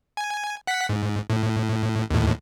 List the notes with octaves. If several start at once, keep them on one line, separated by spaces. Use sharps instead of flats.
G#5
F#5 B6
G#2
A2
D#2 A2